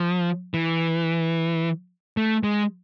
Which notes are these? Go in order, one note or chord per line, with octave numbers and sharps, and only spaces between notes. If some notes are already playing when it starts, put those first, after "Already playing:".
Already playing: F3
E3
A3
G#3